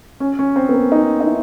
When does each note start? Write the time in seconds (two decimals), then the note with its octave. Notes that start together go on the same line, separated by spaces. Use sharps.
0.20 C#4
0.39 C#4
0.56 C4
0.69 B3
0.73 A#3
0.92 D#4
1.21 D#4
1.26 E4